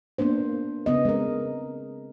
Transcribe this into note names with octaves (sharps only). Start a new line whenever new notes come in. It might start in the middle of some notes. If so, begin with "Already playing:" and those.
A#3 B3 D4 C5
C#3 B3 D#5
G#3 C4 A#4